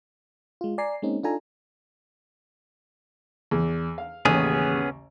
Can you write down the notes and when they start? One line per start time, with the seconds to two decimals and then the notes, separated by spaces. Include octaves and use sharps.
0.61 G#3 F4
0.78 D5 G#5 A#5 C7
1.02 G#3 A#3 C4 C#4 D#4
1.23 D4 D#4 F4 A4 G#5 A#5
3.51 E2
3.98 F5
4.25 A1 D#2 C#3 B3 C#4 G#4